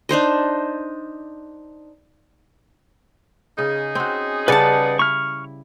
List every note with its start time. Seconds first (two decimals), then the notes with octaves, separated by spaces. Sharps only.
0.09 D4 D#4 C5 D#5
3.58 C#3 C#4 D#4 G#4
3.95 C4 F#4
4.48 C#3 G3 G4 B4 D5 F#5 G#5 A5
4.99 E4 C#6 F6